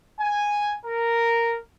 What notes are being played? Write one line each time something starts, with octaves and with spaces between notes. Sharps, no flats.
G#5
A#4